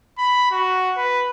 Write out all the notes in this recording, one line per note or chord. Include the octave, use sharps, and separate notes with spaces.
B5
F#4
B4